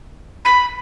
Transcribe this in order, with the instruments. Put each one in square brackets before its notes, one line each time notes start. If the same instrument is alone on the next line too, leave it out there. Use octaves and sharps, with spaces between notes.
[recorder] B5